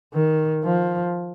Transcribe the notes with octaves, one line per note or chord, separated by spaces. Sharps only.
D#3
F3